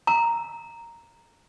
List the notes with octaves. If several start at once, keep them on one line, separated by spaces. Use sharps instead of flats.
A#5